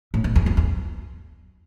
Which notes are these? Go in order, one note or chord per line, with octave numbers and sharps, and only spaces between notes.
A2
F2
E2
F2
E2